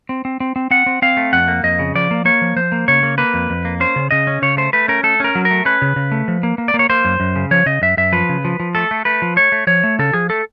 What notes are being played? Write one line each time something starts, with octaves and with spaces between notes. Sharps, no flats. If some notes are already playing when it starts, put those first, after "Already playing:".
C4
C4
C4
C4
C4 F#5
C4
C4 F5
A3
F2 F#5
A#3
F2 D#5
C#3
F3 D5
A#3
A#3 C#5
F3
F3 C5
A#3
C#3 C#5
A#3
A#3 B4
F2
F2
A#3
C#4 C5
C#3
C#3 D#5
C#4
C#3 C#5
A3 C5
A3 B4
C#4 A#4
A3 A4
C#4 A#4
F#3
A#4
A3
C#4 B4
C#3
C#3
A3
F3
A#3
A#3
D5
A#3
C#5
A#3 C5
F#2
F#2
C#3
F3 C#5
C#3 D#5
F#2 E5
F#2 E5
F3 B4
C#3
F3
F3
A3 A4
A3
A3 B4
F3
A3 C#5
A3
F3 C#5
A3
C#3 A4
F3 G#4
A3 A4